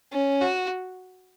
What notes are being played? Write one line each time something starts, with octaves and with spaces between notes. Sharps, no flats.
C#4
F#4